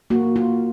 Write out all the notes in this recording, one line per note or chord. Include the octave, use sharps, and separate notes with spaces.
A#3 F#4
F4